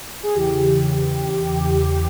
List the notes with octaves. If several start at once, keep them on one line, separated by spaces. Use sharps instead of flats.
G#4
E2 C#3 E3 G4